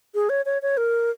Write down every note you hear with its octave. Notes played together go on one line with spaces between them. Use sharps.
G#4
C#5
C#5
C#5
A#4